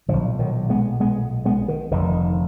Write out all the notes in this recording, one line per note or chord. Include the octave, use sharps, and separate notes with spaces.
B1 A#2 D3 F3
D#3 F#3
G#3 B3
G#3 B3
G#3 B3
D#3
F1 F2 D3 D#3